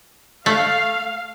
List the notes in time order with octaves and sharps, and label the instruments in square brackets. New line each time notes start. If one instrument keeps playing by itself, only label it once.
[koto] A3 [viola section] F5